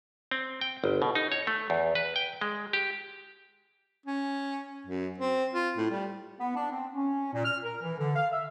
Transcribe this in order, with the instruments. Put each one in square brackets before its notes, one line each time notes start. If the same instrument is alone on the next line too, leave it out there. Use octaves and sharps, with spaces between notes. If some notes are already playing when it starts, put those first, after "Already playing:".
[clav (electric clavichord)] C4
G5
G1
B2
D#4
C#5
A3
E2
B4
G5
G#3
G4
[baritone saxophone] C#4
F#2
C4
F4
A2
G3
[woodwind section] B3
D4
C4
C#4
A#2
F6
A#4
E3
D3
F5
E5